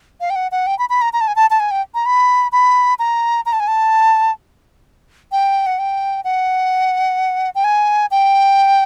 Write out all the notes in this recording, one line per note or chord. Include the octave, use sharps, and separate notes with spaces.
F5
G5
F#5
F#5
G5
B5
B5
A#5
A#5
A5
G#5
A5
A5
G#5
G5
A#5
B5
B5
A#5
A#5
A5
G#5
A5
G5
F#5
G5
F#5
G5
G#5
G5